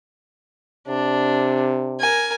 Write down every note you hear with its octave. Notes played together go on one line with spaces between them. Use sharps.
C3 D4
A#4 G#5